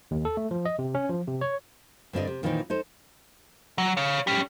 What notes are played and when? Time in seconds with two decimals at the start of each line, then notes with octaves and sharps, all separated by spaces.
0.11 D#2
0.25 A4
0.37 A3
0.51 F3
0.65 D#5
0.79 C3
0.95 C#4
1.09 F3
1.27 C3
1.41 C#5
2.13 G2 D3 C4 F#4 D5 D#5
2.27 C3
2.43 A#2 D#3 E3 B3 C4 D#4
2.70 D#4 A4 C5
3.78 F#3
3.97 C#5 F5
4.27 C#4 G4